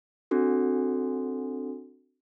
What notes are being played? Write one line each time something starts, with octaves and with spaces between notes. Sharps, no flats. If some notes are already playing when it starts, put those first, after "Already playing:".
C4 D4 F#4 A4